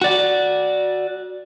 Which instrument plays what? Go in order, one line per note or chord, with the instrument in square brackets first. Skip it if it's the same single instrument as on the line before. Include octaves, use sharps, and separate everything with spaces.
[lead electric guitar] F#4 D5